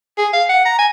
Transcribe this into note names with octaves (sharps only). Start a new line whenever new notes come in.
G#4
F5
F#5
A#5
G#5